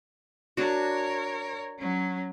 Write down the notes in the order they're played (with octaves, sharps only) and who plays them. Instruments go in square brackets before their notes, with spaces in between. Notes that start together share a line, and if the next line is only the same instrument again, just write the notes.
[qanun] D4 F#4 [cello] A#4 C#5
[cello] F#3 C#4